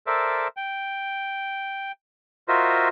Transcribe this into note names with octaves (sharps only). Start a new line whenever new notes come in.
A4 A#4 C5 D5 E5
G5
F4 F#4 A#4 C5 D#5 E5